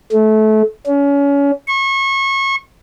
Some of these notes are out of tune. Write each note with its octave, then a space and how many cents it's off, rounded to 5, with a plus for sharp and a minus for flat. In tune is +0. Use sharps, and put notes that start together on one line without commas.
A3 -25
C#4 +30
C#6 -30